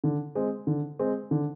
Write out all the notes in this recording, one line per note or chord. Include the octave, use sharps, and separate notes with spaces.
D3
G#3 C4
D3
G#3 C4
D3